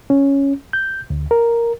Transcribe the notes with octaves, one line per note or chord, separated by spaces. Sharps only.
C#4
G6
D2
A#4